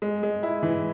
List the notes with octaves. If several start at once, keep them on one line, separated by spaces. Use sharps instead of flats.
G#3
G#3
E4
E3